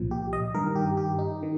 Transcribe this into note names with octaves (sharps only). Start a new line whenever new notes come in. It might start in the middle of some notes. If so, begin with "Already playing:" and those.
Already playing: C2 A#2 F3
G4
D#5
G2 D#3 A#4
G4
G4
D#4
D#3